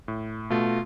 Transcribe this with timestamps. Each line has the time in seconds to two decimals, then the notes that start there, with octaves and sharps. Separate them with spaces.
0.08 A2
0.50 B2 A3 F4